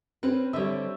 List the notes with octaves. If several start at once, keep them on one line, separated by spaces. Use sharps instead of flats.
C4 C#4 B4
D3 G3 C#5 E5